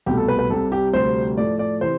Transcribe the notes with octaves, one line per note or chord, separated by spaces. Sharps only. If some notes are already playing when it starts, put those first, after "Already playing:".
C2 B2 A3 G4
A4
B4
B4
C2 C3 G3 A4
G4
D2 C3 G3 C5
A2 F3 A3 D5
D5
C3 E3 C5